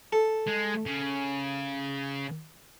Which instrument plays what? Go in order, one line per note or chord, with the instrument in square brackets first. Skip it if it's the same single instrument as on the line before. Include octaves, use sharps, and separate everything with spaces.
[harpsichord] A4
[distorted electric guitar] G#3
C#3